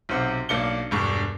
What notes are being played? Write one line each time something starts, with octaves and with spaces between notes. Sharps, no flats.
B1 C3 C5 F#5
B1 A#3 D4 C#7 G7
E1 G2 C#6